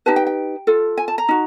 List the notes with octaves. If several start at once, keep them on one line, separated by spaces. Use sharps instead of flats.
D#4 G4 B4 A5
G5
G5
F4 A4
G#5
A5
A#5
D#4 F#4